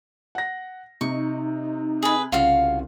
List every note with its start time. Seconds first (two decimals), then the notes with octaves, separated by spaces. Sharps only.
0.35 F#5 A#6
1.01 C3 D#4 C#6
2.03 G#4 B4
2.32 C2 C#3 F4 F#4 F5